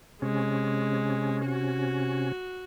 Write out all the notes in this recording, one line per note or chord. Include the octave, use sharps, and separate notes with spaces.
C3 G#3 C#4
F#4